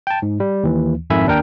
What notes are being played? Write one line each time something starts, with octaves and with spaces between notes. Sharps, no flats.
G5 A5
G#2
G3
D#2 E3
G#1 F2 D#3 E5 G#5 B5
D#2 D4 A#4 G5